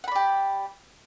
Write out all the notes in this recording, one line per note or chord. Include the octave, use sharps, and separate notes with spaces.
G4 D5 F#5 B5